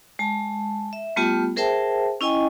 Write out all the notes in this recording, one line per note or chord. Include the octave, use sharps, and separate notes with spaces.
G#3 A5
E5
G3 A3 B3 F4 G4
G#4 A#4 C5 E5 G5 A5
C#4 E4 D#5 G5 G#5